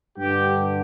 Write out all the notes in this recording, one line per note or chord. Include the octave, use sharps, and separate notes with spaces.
G2 D3 G4